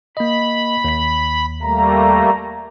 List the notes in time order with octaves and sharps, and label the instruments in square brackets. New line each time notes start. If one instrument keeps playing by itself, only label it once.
[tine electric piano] A#3 D#5 [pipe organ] B5
[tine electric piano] D#2 B6
[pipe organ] G3 A3 A#3 [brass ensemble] A#5